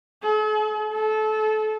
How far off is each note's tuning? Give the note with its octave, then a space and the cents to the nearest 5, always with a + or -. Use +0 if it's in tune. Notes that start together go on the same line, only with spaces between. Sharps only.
A4 -45
A4 -25